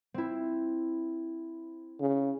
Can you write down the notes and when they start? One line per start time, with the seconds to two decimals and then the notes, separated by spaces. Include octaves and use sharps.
0.14 C4 E4
2.01 C#3